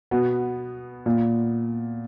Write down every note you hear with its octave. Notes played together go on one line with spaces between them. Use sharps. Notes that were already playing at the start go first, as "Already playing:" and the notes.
B2 B3
A#2